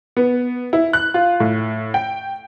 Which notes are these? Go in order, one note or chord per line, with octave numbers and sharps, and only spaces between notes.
B3
E4
F#6
F4
A2
G5